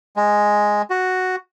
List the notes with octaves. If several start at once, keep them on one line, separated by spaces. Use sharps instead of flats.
G#3
F#4